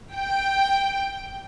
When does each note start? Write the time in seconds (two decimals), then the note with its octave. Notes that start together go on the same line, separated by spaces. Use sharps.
0.15 G5